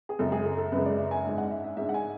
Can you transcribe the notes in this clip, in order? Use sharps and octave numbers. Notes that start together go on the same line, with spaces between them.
G#4
F#2 C#3 G#3 A4
G#4
A4
A4
F#2 C#3 G#3 B4
D5
E5
G#5
G#2 G#3 D4 G#5
F#5
E5
E5
G#2 G#3 D4 E5
F#5
G#5